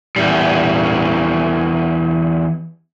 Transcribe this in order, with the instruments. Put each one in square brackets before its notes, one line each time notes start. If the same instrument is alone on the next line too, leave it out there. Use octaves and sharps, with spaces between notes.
[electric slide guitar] E2 G3